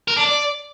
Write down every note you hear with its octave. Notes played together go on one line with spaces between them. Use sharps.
A#4
D4
D5